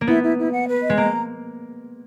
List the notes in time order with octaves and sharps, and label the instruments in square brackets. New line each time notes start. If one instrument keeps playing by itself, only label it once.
[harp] A#3
[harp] B3 [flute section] E4
[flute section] E4
E4
F#5
B4
D#5
[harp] G#3
[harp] A#3 [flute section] A#5